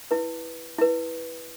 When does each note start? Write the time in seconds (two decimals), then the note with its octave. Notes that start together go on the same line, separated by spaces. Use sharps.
0.11 E4 B4
0.78 E4 B4